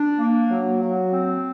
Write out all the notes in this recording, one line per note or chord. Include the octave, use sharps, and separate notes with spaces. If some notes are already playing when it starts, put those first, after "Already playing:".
Already playing: D4
A#3
F#3
F#3
C4